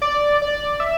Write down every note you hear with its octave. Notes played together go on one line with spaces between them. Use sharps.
D5
D5
E5